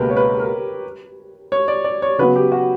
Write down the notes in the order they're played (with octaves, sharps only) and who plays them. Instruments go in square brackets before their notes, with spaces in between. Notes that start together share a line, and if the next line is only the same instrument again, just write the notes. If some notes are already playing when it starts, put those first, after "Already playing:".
Already playing: [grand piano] C#2 B2 A#3 [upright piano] G4 A#4 B4
[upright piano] C#5
B4
A#4
C#5
D5
D5
C#5
[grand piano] C#3 F#3 B3 [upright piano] B4
[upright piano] G4
F#4